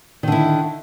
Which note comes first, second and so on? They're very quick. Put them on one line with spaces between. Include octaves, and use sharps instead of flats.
D#3 D3 E4